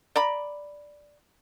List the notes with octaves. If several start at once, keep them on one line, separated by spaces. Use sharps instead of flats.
D5 A#5 B5